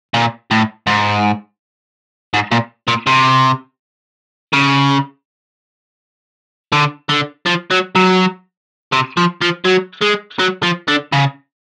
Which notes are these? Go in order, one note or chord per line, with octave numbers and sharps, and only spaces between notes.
A#2
A2
G#2
G#2
A#2
A#2
C3
C#3
D3
D3
F3
F#3
F#3
C3
F3
F3
F#3
G#3
F#3
F3
D3
C#3